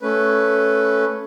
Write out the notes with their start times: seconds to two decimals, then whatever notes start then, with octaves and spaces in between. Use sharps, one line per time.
0.01 A3 C#4 B4